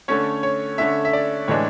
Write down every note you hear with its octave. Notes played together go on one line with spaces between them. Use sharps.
D3 A3 C#4 C#5
C#5
D3 A3 C#4 E5
E5
D5
A2 E3 G#3 D4 C#5